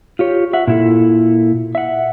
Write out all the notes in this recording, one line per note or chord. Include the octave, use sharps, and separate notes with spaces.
F4 G4 C#5
E5 F#5
A#2 E4 A4
E5 F#5